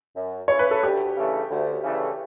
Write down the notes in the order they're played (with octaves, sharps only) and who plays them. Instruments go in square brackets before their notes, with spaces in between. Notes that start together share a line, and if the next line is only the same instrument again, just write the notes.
[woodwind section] F#2
[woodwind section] C#3 E3 [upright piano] C#5
[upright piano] B4
A4
[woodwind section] D2 [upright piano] G4
[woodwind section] C#3 E3 A3 D4
D2
C#3 E3 A3 D4